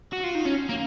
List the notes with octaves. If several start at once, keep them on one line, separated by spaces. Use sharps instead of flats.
F#4
F4
D#4
C#4
A#3